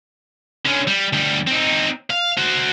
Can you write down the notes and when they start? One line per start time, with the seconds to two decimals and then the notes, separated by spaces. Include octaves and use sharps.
0.66 D3 C#4
0.87 G3
1.13 D2 G3
1.47 C4 D#4
2.10 F5
2.37 F#4 C5